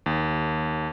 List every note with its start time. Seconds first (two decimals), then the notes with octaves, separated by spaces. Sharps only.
0.06 D#2